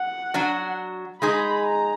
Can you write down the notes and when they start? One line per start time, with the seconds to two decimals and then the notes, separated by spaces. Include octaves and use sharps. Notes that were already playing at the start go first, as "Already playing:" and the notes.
Already playing: F#5
0.34 F#3 D4 F#4
1.21 G#3 D#4 G#4 B5
1.66 A#5